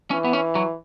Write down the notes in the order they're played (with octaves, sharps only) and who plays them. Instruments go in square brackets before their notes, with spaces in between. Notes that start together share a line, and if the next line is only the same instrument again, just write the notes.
[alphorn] E3 [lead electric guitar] C#4
[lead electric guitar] B3
C#4
F#3